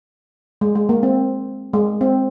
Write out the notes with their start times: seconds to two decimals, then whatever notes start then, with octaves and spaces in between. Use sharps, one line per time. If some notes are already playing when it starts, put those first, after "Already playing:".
0.61 G#3
0.75 G#3
0.89 A#3
1.03 C4
1.73 G#3
2.01 C4